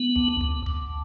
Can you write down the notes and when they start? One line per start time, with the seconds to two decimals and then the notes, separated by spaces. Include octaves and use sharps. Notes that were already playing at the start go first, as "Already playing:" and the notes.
Already playing: B3
0.16 D2
0.41 D2
0.66 D2